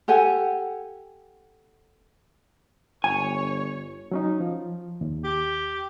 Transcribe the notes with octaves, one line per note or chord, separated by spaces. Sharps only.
G4 A4 F#5 G#5
G1 C#5 G#5
F#3 C#4 D#4
F3
D#2
G4